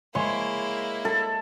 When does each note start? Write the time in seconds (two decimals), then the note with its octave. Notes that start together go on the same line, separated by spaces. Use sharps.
0.15 G#3 A#3 E4 C#5 C6
1.05 A4